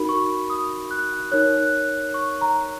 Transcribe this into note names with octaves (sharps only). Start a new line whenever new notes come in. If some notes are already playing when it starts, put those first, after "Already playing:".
Already playing: D#4 F#4 A#4 B5
C#6
D#6
F#6
D#4 A#4 C#5 F#6
F#6
C#6
A#5